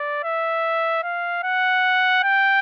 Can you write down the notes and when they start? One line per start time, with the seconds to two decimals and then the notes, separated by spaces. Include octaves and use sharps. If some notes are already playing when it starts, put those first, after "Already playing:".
Already playing: D5
0.24 E5
1.03 F5
1.43 F#5
2.23 G5